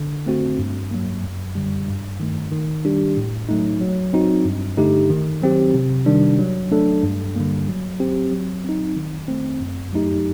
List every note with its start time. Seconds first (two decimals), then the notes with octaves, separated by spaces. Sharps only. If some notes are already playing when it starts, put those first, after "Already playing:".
Already playing: D3
0.26 A3 C4 F#4
0.59 G2
0.91 F#3 A#3
1.23 F#2
1.55 D3 G3
1.88 G2
2.20 D#3 A3
2.52 D#3
2.85 G3 D4 G4
3.17 A2
3.49 F#3 A3 D#4
3.81 F#3
4.13 C4 D#4 F#4
4.45 G2
4.77 D3 A3 D#4 G4
5.10 D#3
5.42 F#3 C4 G4
5.74 C3
6.06 D#3 G3 D4
6.39 F#3
6.72 A3 D4 A4
7.03 G2
7.36 D3 G3 A#3
7.68 F#3
8.00 C4 G4
8.32 F#3
8.64 C4 D#4
8.96 D#3
9.28 A3 C4
9.61 F#2
9.93 F#3 A3 D#4 G4